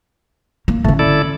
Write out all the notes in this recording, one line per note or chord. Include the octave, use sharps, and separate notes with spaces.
A#3
D3 A3 C#4
E4 A4 D5